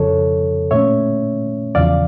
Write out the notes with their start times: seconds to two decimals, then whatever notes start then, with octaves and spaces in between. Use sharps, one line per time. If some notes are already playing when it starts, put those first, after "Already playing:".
Already playing: F2 C#3 F3 A4 C#5
0.71 A#2 A3 C#4 C#5 E5
1.75 E2 C#3 F3 D5 F5